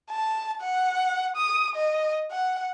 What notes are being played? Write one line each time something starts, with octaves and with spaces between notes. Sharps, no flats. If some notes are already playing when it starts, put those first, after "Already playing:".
A5
F#5
D#6
D#5
F#5